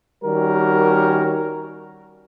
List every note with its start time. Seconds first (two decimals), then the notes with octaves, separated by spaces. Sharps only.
0.24 D#3 G3 C#4 F#4 A#4